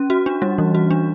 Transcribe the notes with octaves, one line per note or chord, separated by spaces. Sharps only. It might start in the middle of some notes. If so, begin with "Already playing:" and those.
Already playing: C#4
F#4
D4
G3
E3
F#4
D4